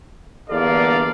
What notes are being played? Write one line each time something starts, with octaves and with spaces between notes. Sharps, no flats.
G1 E2 D3 A#3 D5 F5